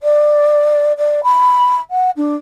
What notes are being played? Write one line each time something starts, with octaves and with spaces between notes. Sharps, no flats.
D5
D5
B5
F#5
D4